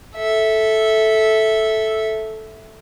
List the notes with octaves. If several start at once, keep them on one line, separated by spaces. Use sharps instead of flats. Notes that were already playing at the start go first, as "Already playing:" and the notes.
A4 E5